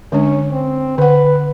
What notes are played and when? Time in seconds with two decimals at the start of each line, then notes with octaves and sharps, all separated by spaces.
0.12 D3 G#3 C#4 D4
0.51 C4
0.98 D3 B4 F#5